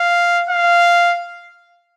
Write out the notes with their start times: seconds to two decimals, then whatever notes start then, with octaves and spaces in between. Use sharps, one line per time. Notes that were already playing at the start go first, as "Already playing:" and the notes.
Already playing: F5
0.50 F5